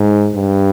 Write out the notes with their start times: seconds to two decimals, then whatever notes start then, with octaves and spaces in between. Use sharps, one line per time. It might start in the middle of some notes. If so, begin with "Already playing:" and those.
Already playing: G#2
0.35 G2